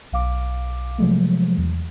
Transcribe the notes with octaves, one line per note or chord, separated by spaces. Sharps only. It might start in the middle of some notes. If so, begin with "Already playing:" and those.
B1 F5 D6
C3 F3 F#3 G#3 A3
E2